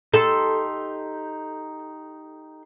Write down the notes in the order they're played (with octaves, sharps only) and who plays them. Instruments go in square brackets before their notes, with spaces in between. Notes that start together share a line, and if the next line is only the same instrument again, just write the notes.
[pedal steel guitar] D#4 G4 C6 [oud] A4